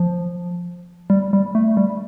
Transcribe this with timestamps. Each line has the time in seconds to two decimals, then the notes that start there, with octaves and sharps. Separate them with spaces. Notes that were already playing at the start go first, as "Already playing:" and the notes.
Already playing: F3
1.10 G3
1.33 G3
1.55 A3
1.77 G3